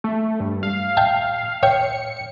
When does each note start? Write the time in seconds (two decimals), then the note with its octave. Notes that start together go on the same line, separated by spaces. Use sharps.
0.04 A3
0.40 G2
0.63 F5
0.97 E5 G5 A5
1.63 C#5 E5 G5 C#7